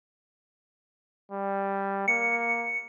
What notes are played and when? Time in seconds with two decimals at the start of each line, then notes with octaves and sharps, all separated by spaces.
1.32 G3
2.08 A#3 C#7